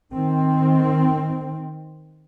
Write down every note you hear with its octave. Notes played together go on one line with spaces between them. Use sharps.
D#3 C4